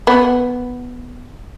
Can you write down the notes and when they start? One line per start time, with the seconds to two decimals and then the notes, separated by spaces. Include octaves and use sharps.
0.07 B3